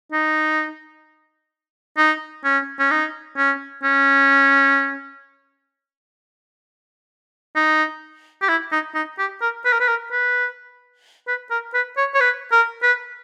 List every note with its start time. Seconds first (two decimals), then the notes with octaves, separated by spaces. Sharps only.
0.12 D#4
1.98 D#4
2.44 C#4
2.79 C#4
2.91 D#4
3.37 C#4
3.84 C#4
7.56 D#4
8.42 G4
8.49 E4
8.72 D#4
8.95 D#4
9.18 G4
9.42 A#4
9.65 B4
9.72 A#4
9.80 B4
9.88 A#4
10.12 B4
11.28 B4
11.51 A#4
11.74 B4
11.97 C#5
12.14 C#5
12.20 B4
12.52 A#4
12.83 B4